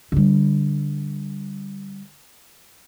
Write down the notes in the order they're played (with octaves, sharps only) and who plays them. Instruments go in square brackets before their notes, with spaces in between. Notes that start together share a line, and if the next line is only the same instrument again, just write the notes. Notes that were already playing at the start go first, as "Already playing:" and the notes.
[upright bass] D3 G3